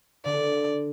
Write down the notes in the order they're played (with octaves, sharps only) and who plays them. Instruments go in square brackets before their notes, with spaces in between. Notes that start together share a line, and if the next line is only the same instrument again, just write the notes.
[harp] D3 [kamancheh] D5